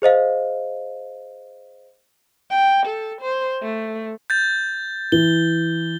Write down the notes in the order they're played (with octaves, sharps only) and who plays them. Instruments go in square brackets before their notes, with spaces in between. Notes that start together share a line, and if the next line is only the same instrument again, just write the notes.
[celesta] G#4 C5 D#5 F5
[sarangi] G5
A4
C5
A3
[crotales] G6 A6
[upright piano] E3 [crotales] G7